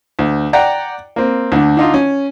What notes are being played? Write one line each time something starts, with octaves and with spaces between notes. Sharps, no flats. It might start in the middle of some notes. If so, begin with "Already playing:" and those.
D2
D5 F#5 G5 A#5
A#3 C4
D2 D3
D3 D#4 F4
C#4